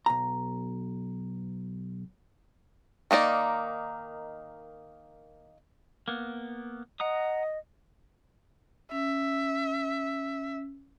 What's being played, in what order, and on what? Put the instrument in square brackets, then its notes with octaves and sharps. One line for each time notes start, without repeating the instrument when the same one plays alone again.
[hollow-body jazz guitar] B1 A#5
[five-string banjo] D#3 A#3 D#4 D5
[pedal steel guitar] A#3 B3
[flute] D#5 [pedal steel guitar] F#5 A#5 D#6
[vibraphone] C#4 [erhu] E5